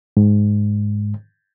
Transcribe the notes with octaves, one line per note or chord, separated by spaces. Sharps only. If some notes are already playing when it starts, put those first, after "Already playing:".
G#2